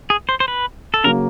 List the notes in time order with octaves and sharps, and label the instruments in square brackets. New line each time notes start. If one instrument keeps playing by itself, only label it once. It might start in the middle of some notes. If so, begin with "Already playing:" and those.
[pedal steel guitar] G#4
C5
C5
B4
A4
[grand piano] C#3 F#3 A#3 [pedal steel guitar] A#4